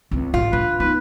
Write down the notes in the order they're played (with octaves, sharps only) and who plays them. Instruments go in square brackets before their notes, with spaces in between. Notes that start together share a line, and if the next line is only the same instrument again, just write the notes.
[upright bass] C#2 C4
[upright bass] A1 [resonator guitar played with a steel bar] F4
[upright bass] D3 [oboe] B4
[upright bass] B3 D#4 [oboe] B4